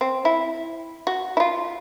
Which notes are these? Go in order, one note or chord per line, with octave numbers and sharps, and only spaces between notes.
C4
E4
F#4
E4 F4